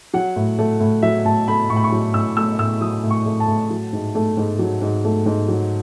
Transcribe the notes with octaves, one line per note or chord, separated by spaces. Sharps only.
F#3 F#5
A2
A3
A2
F#3 E5
A2 A5
A3 B5
A2 C#6
B5
C#6
F#3
A2 E6
A3 E6
A2 E6
F#3 D#6
A2
C#6
A3
A5
A2
F#3
G#2
A3
G#2
F#3
G#2
A3
G#2
F#3